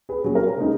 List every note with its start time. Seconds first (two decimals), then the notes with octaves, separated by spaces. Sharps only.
0.09 G#4 B4
0.24 A#2 F#3 C#4 G#4
0.35 A#4
0.57 C#3 G#3 D#4